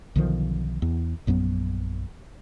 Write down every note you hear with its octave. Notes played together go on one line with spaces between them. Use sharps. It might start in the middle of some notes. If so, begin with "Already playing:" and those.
B1 D3 D#3 F3
E2
A#1 F#2 F#3 B3